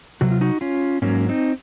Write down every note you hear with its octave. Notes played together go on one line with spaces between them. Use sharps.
C3 F#3 F#4
F4
D#4 F#4
C#4 F4
G#2 F#3 A#3 C#4
C4 D#4